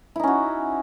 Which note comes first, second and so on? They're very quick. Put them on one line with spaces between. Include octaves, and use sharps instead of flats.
E4 D#4 C#4 F#4